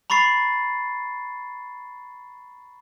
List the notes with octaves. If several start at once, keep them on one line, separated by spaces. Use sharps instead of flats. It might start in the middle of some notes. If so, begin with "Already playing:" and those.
A#5 B5 C#6 A6 C7